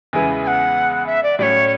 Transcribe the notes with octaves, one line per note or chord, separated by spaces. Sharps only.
E2 C#3 G#3 B3 E4 G#5
G#5
F#5
E5
D5
A2 F#3 A3 C#4 C#5 D5